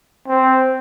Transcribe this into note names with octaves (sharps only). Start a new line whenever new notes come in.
C4